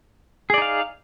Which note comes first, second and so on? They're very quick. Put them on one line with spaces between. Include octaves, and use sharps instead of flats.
G#4 D5 D#4 F5